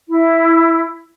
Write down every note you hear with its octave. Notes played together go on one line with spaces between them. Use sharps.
E4